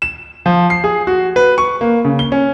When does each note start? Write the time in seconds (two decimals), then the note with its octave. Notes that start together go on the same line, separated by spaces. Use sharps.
0.02 E7
0.46 F3
0.70 C7
0.84 G#4
1.07 F#4
1.36 B4
1.58 C#6
1.81 A#3
2.05 C#3
2.19 G7
2.32 C#4